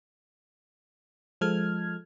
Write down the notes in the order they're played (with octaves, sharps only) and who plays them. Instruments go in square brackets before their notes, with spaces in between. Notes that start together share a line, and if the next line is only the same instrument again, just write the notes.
[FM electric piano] F3 G#3 A4 F6 G#6